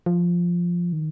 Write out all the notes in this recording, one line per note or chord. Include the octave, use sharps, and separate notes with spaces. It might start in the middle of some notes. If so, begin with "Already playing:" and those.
F3
D#3